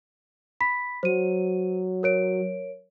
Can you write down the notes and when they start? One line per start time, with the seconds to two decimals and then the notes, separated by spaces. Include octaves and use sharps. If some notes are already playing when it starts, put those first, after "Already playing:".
0.61 B5 B6
1.03 F#3 C5 D#7
2.03 A#4 C#5 D7